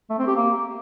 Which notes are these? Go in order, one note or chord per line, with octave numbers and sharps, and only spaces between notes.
A3
C4
G4
A#3